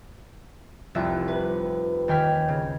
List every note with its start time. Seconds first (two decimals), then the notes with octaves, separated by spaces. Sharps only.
0.95 F1 C2 F4 E5
1.28 B4
2.08 D#2 D#3 G5 G#5 F6 B6
2.48 C#3